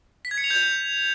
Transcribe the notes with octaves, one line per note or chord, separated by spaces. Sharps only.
B6
G#6
C#7
F7
G6